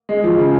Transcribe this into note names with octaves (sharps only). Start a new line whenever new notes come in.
G#3
F3
C#3